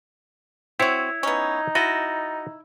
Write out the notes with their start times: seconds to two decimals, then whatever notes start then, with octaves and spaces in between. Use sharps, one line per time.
0.79 C4 E4 F#4 C#5 E6 G#6
1.23 B3 C#4 D#4
1.75 E4 F#4 D#5 A6